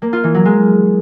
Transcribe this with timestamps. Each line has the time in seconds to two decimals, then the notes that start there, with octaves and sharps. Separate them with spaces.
0.02 A#3
0.13 F4
0.24 E3
0.34 F#3
0.45 G#3